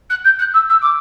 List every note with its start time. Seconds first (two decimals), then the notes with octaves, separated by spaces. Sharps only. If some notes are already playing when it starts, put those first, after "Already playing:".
0.10 F#6
0.24 G6
0.39 F#6
0.53 E6
0.69 E6
0.81 D6